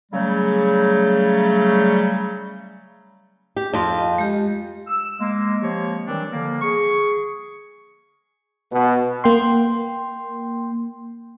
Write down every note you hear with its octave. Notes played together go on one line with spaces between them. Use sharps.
C#3 F#3 G3 A3
G4
F2 F4
D#5
G#3 G4
E6
G#3 A#3
F3 G#3 A#3 C4 G4 C#5
D#3 E3 F#3 G3 C4 D4
D3 F3 G3 A#3
G#4 C#6
B2
A#3 G5 C6